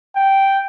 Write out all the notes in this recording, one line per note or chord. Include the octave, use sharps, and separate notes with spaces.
G5